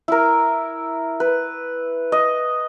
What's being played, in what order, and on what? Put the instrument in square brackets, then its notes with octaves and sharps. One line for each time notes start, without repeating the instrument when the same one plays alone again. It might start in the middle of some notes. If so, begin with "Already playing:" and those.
[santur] E4 A#4
B4
D#5